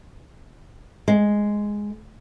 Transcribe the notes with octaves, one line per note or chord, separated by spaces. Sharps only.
G#3